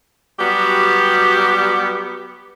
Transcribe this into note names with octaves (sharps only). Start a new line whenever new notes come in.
F#3 G3 B3 F#4 G4